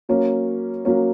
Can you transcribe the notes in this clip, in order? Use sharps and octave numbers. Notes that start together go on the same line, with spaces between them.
F#3 A#3 C#4
F#3 A#3 C#4